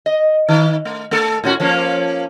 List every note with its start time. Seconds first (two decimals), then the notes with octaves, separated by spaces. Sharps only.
0.06 D#5
0.49 D#3
0.85 A3
1.11 A3 A4
1.44 A2 C#4 F#4
1.60 F3 A#3 C#4